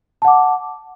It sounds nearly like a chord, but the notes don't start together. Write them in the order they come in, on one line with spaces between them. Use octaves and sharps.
A5 F#5 D6